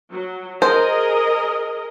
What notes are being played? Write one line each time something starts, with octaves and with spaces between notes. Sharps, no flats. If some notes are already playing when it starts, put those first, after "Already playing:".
F#3
G#4 A#4 C5 D#5